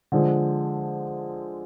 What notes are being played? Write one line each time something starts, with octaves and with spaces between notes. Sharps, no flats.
D3 F3 G#3